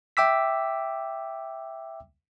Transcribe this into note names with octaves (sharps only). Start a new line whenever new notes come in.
E5 G5 D6 E6 B6